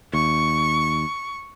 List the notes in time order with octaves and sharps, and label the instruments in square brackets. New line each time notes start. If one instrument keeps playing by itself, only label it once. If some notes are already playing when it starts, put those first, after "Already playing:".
[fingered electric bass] D#2 [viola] C#6